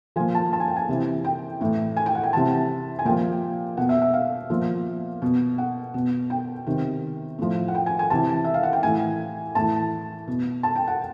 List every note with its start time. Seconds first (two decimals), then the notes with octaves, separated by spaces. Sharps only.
0.16 F3 G#5
0.20 A#2
0.35 A5
0.53 A5
0.60 G#5
0.68 G5
0.76 G#5
0.89 C3 E3
1.25 G5
1.61 A2 E3
1.97 G#5
2.06 G5
2.15 F#5
2.23 G5
2.33 C3 E3 A5
2.99 G#5
3.05 A#2 F3 G5
3.77 B2 F#5
3.89 E5
4.02 E5
4.13 F5
4.50 A#2 F3
5.22 B2
5.58 F#5
5.94 B2
6.30 G5
6.67 C3 D#3
7.39 A2 F3
7.68 F#5
7.75 G5
7.86 G#5
7.99 G#5
8.10 C3 E3 A5
8.44 E5
8.54 F5
8.63 F#5
8.73 G5
8.83 A2 E3 G#5
9.55 A2 E3 A5
10.28 B2
10.63 A5
10.75 G5
10.87 F#5